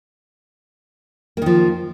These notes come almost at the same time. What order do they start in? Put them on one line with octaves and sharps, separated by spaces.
A#3 D#3 F3